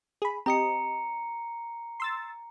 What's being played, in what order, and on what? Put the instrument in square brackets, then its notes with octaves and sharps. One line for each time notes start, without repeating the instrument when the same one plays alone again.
[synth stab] G#4 B5
[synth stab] C4 G4 D#5 [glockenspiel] A#5 C#7
[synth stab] C6 E6 A6